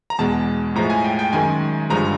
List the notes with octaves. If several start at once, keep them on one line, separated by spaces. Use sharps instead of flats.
A#5
E2 B2 G#3 A5
A2 F3 G#3 A#5
G#5
G5
G5
F#2 D#3 G#3 G#5
G2 D3 F3 G#3 A#5